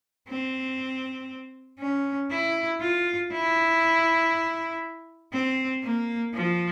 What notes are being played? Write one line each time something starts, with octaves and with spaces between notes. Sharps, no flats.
C4
C#4
E4
F4
E4
C4
A#3
F3